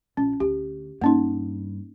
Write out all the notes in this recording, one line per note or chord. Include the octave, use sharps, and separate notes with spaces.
A#1 C#4
D2 G4
G2 A#3 C#4 D#4